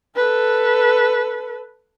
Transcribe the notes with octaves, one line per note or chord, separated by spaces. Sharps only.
A4 B4